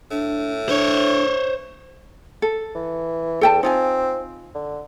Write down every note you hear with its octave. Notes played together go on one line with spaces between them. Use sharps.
A2 D4
D4 C5 C#5
A4
E3
E2 A4 G5 A5
C4 D#4 F4 G#5
D3